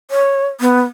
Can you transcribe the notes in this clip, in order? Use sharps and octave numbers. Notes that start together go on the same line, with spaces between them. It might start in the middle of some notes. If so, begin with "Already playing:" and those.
C#5
B3